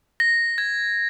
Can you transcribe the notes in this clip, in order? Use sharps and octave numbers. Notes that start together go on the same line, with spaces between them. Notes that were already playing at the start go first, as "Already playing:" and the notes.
A#6
G#6